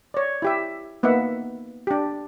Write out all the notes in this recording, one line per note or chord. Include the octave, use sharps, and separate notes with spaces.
C#5 D5
E4 G4 E5
A#3 B3 D#4 E5 F#5
D4 G4